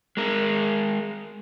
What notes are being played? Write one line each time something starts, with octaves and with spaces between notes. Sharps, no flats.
G#3 A#4